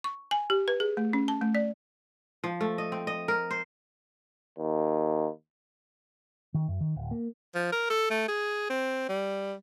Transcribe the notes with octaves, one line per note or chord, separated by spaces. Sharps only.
C#6
G#5
G4
B4
G#4
A3
C#4
A5
A3
D5
F3
A3
D#5
C4
D#5
A#4
C5
D#2
D#3
F#2
D#3
D1
A#3
F3
A#4
A4
A3
G#4
C4
G3